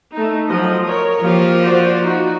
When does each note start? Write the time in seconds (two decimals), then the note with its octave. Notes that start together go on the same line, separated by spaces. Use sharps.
0.12 A3 D#4
0.49 F3 F#3 D#5
0.85 A#4 C#5
1.22 F3 A#3 G4 F5
1.63 F#4 C5 D5
2.02 D#4 F#4